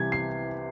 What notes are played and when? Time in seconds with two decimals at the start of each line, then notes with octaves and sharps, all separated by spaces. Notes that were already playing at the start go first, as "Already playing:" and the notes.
Already playing: C2 C3 E3 G#6
0.12 C7